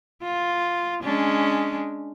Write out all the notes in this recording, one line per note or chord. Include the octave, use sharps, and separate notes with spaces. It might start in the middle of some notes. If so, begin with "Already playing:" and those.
F4
G#3 C#4 D4